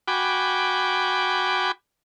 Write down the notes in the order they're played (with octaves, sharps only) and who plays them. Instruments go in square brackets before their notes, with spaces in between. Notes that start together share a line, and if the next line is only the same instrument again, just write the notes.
[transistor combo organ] F#4 G5 G#5 B5 D6